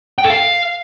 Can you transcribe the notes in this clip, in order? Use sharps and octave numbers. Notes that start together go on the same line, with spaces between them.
G5
A4
F5